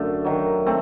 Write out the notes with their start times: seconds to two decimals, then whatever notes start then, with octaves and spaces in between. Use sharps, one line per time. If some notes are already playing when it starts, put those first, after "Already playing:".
Already playing: F#2 D3 A3
0.24 D#3 F#3
0.66 A3 C4